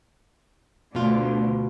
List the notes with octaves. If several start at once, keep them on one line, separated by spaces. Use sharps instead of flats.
D2 B2 D3 F4